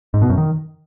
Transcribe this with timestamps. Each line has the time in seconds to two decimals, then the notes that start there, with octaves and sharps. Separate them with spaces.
0.14 G#2
0.22 B2
0.30 F#2
0.38 D#3